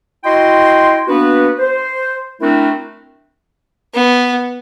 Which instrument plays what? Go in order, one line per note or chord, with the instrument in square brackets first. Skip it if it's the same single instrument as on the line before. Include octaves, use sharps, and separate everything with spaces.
[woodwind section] E4 F#4 D#5 G5 C6
A#3 B3 D4 F#4 B4
C5
A3 C4 D4 E4 F#4 A#4
[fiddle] B3